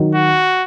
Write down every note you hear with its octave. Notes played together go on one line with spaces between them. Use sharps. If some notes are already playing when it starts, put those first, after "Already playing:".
Already playing: D#3 F#3
F#4